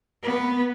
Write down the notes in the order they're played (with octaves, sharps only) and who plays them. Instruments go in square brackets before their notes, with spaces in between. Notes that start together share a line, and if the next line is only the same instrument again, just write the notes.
[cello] B3